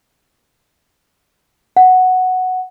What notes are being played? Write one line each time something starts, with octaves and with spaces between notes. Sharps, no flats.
F#5